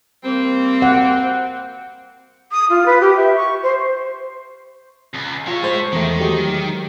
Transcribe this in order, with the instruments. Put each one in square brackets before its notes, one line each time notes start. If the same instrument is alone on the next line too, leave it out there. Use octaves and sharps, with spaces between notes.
[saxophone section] G3 A#3 C4
[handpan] F#5
[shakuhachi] D#6
F4
B4
G4
E5
C#6
C5
[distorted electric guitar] C#2
[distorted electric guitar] A3 C#5 [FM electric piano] F4
[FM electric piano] G#3 C5
[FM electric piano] E2 A3 [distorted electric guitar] D#3
[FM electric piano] F#3 G#3 G4